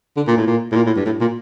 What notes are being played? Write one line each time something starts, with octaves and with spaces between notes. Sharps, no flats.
D3
A#2
A2
A#2
A2
A#2
A2
G2
A2
A#2